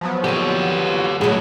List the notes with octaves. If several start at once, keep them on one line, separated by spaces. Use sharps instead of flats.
F3 F#3 B3
D3 C4 G4 C#5
A2 F#3 G3 G#4